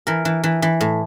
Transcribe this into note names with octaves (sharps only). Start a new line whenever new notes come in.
E3 A#4
E3
E3
E3
A2